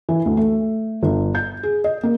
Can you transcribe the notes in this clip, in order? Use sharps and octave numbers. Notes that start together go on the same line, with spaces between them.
E3
D2
A3
G1
G6
G#4
D#5
A#3